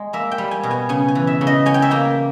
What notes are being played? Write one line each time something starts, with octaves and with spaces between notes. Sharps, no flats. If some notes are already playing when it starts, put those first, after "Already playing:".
Already playing: G#3
A#3 E5
G5
G3
G#5
B2
G#5
C#3 G#5
G#5
E3
E5
C#3
D#5
C#4 G#5
G5
E5
A#3 G5